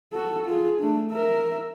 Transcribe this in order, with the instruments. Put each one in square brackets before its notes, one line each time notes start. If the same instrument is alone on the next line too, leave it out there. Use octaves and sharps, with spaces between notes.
[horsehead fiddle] F#4 A4
F4 G#4
A3 D4
A#4 E5